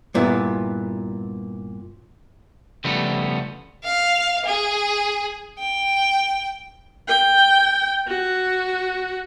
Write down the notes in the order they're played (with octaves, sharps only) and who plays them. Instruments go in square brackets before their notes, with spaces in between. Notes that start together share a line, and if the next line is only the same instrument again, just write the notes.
[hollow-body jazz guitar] G2 A#2 B3 E4
[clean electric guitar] C#3 F3 G3 A3 B3
[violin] F5
G#4
G5
[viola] G5
F#4